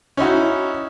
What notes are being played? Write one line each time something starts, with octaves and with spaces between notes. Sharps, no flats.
C#4 D#4 E4 F#4